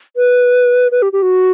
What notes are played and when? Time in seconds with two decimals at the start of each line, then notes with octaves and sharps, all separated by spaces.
0.17 B4
0.92 B4
1.02 G4
1.13 G4
1.22 F#4